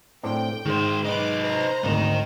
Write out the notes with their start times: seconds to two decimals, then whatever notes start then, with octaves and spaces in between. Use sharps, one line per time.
0.23 A2 C4 D4 G5
0.66 G#2 D#3 C5
1.05 D#4 B4 D6
1.42 C5 A#5
1.84 G#1 D2 D#4 A#4